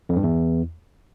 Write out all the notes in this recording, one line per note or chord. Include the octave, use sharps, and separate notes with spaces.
F2
G2
E2